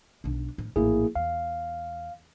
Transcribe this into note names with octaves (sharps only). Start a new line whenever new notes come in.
B1 D4
A2
A#1 A2 A#3 E4 G#4
E2 F5